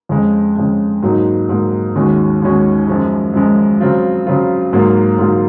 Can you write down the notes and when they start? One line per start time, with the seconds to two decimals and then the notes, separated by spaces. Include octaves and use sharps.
0.09 F2 C#3 G#3
0.56 F2 C#3 G#3
1.02 G#2 F#3 A#3 D#4
1.49 G#2 F#3 A#3 D#4
1.95 D#2 D#3 G#3 C#4 F#4
2.42 D#2 D#3 G#3 C#4 F#4
2.87 F#2 F3 G#3
3.34 F#2 F3 G#3
3.81 C#3 F#3 C4 F4
4.27 C#3 F#3 C4 F4
4.73 G#2 F#3 A#3 F4
5.18 G#2 F#3 A#3 F4